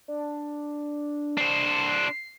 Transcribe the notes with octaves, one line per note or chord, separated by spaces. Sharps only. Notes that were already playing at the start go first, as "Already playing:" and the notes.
D4
D4 C5 C7